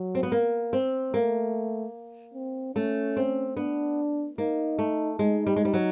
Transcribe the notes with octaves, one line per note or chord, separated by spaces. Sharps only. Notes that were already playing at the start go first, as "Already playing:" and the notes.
Already playing: F#3
C4
B3
A#3
C4
A3 A#3
C4
A3 C#4
C4
B3 D4
A#3 D#4
A3
G#3 D#4
G3
G#3
G3
F#3